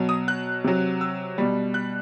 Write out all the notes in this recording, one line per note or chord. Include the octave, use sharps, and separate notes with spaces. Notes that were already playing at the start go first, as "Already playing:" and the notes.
Already playing: B2 F#3
D#6
F#6
C3 F#3
E6
B2 G3
F#6